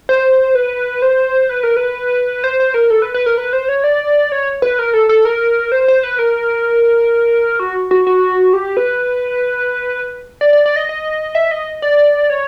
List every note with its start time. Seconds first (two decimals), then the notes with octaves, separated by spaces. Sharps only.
0.09 C5
0.55 B4
1.02 C5
1.49 B4
1.63 A#4
1.76 B4
2.44 C5
2.60 C5
2.74 A#4
2.90 A4
3.02 B4
3.14 B4
3.26 A#4
3.38 B4
3.53 C5
3.69 C#5
3.84 D5
4.32 C#5
4.62 B4
4.79 A#4
4.94 A4
5.09 A4
5.25 A#4
5.72 C5
5.88 C5
6.04 B4
6.19 A#4
7.60 F#4
7.91 F#4
8.07 F#4
8.53 G4
8.77 B4
10.41 D5
10.53 D5
10.66 D5
10.76 D#5
10.89 D#5
11.35 E5
11.51 D#5
11.82 D5
12.30 C#5